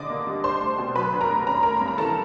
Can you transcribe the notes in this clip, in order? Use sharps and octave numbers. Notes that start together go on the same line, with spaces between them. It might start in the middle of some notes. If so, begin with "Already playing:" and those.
Already playing: D#2 D3 D5 D#5 D6
A#3
G3
D4 C5 C6
A3
B2
F#3 B4 B5
D4
A#4 A#5
A3
C#4 A#5
B5
A3 A#4 A#5
G2 B5
A#5
E3 A4 A5